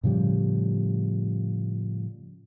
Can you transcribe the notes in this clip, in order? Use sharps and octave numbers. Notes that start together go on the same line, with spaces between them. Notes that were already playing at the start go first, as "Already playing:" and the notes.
A2 C#3 F3 G3